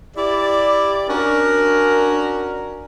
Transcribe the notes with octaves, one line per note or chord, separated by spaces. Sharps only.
E4 G4 D5
C#4 D4 F#4 A#4